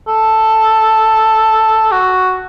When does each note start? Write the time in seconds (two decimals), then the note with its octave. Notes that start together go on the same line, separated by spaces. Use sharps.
0.08 A4
1.91 F#4